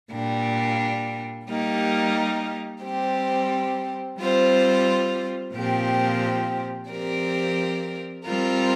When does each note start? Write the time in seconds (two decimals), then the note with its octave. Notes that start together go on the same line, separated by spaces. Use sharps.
0.11 A#2 G3 D4
1.47 G3 A#3 D#4 G4
2.82 G3 C4 G4 C5
4.18 G3 C4 F4 C5
5.54 A#2 F3 C4 G4
6.89 F3 C4 G4 A#4 D5
8.25 G3 C4 F4 A#4